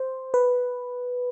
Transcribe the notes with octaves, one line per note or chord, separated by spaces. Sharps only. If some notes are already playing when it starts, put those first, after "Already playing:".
Already playing: C5
B4